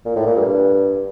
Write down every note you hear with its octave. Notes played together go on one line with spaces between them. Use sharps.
A#2
A2
A#2
G2